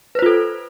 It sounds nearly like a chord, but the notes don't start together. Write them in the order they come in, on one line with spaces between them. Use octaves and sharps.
B4 C5 F4 A4